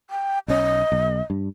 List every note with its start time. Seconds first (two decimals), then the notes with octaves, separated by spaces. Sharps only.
0.10 G5
0.48 B1 C#4 D#5
0.92 B1
1.30 G2